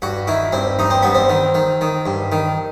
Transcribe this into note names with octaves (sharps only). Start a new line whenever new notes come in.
G2 F#4
D#3 E4
G2 C4
G2 D#4
C4
G2 B3
C4
D#3
D#3
D#3
G2
D#3